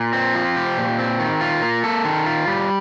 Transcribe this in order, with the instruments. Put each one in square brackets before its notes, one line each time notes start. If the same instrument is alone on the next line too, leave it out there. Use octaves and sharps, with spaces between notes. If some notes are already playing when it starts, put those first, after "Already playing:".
Already playing: [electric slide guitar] A#2
C4
F3
G4
A#2
C4
D#3
F4
A#3
A4
D#3
F4
G3